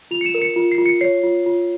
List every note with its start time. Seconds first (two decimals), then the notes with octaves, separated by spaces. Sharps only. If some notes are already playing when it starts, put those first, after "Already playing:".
0.11 F4 F7
0.21 C#7
0.26 E7
0.34 A#4
0.42 C#7
0.56 F4
0.72 C7
0.78 F4
0.86 C#7
1.01 C#5 C7
1.24 F4
1.46 F4